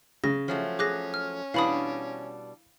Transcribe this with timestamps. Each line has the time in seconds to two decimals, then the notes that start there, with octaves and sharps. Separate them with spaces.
0.24 C#3 A#6
0.48 F3 F#3 A3 C#4
0.79 G#4 D6 F#6 A#6
1.14 F6
1.54 B2 E3 G3 D4 F5 B5 D#6